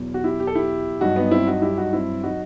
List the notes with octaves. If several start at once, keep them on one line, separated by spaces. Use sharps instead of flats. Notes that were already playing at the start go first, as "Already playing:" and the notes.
Already playing: E2 B2 F#3
F#4
E4 G4
G4
A4
E4 G4
G2 F#3 D#4 F#4
B3 D#4
C4 E4
D#4 F#4
E4 G4
D#4 F#4
C4 E4
F#3 D#4 F#4